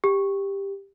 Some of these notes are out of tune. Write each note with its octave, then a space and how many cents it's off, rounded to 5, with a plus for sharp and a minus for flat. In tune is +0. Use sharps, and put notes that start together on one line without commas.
G4 +10